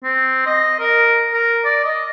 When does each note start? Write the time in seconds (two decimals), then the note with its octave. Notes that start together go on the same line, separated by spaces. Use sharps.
0.04 C4
0.46 D#5
0.80 A#4
1.34 A#4
1.65 D5
1.84 D#5